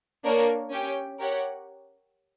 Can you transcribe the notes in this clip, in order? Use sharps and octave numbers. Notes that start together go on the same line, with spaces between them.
A#3 D4 A#4 C#5
C#4 G4 C#5 G5
G4 A#4 C#5 F#5